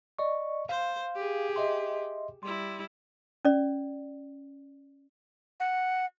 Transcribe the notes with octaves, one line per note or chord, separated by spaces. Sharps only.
D5 D#5 C#6
C5 F5
G4 G#4
D#5 E5 C6
G3 E4 C6
C#4 D5
F#5